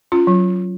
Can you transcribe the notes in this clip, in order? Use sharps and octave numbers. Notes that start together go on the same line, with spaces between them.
C#4 F4
F#3